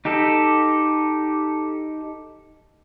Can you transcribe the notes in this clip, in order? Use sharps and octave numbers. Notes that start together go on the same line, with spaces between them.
D#4 G4 A4